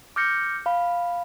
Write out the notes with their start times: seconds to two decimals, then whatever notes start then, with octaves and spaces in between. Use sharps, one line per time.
0.16 D6 F6 G6 A#6 C#7
0.66 F5 B5